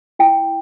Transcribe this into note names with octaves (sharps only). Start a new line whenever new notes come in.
E4 G5